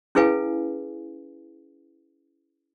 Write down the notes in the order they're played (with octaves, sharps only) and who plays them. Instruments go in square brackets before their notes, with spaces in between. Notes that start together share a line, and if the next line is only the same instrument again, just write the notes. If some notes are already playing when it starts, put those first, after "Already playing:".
[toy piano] C#4 E4 G#4 B4 F5 G#5